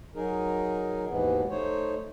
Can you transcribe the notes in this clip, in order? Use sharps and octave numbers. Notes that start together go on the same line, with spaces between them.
F#3 D#4 G#4 A#4
D#2 G#2 B2 E3 B3
A3 D#4 C5 C#5